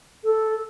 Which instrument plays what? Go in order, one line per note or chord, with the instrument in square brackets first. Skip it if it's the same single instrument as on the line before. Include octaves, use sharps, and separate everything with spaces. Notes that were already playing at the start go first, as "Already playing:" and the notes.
[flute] A4